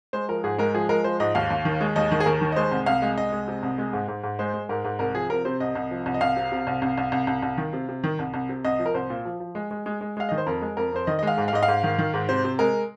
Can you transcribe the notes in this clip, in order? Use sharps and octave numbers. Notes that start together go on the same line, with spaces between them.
G#3 C5
F3 A#4
G#2 G#4
G#3 A#4
F3 G#4
G#3 A#4
F3 C5
G#2 D#5
D#2 F5
D#2
D#3
G#3
D#2 D#5
D#3
G#4
D#2 A#4
D#3
D#5
G#3 C5
C2
C2 F5
G#3
C2 D#5
G#3
C3
C2
G#3
G#2
G#2
G#2
G#3 C5
G#3
G#2 A#4
G#2
C2 A#4
F3 G#4
C3 A#4
C3 C5
C2 D#5
C2
F3
C2
D#5
C2 F5
C3
C3
C2
C2
C2
C2
C2
C2
D#3
C3
C3
D#3
C2
C2
C3
C2 D#5
F3
A#4
C2 C5
A#2
F3
F3
G#3
G#3
G#3
G#3
G#3 F5
D#3 D#5
C5
F2 A#4
G#3
F2 A#4
F2 C5
D#3 D#5
D#5
G#3 F5
G#2
F5
G#2 D#5
F5
G#2
D#3
D#3
G#2
C3 C5
C3
G#3 A#4